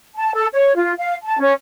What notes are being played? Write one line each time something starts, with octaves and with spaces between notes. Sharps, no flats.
A5
A4
C#5
F4
F5
A5
C#4